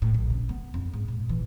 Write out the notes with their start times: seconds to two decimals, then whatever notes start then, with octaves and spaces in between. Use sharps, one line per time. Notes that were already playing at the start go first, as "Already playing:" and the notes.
0.02 A2
0.14 A#1
0.30 C#3
0.49 B3
0.74 F2
0.94 G#2
1.08 A#2
1.29 E3